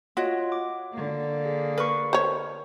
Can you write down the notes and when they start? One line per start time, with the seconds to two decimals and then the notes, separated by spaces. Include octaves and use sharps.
0.17 F4 F#4 C#5 D#5
0.52 D6
0.92 D3 A#3
1.45 G#4
1.78 A#4 B4 C#6
2.13 C5 C#5